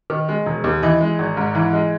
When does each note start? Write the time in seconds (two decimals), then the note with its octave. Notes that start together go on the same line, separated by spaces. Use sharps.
0.10 D#3
0.28 G#3
0.46 E1
0.64 D#2
0.83 E3 D#5
1.01 G#3
1.19 G#1
1.37 G#2
1.55 E3
1.73 G#3